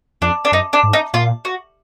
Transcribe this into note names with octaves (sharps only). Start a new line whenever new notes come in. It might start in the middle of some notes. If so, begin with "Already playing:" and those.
F2 D4
D4
F#2 D#4
D4
G#2
D#4
A#2 F4
F#4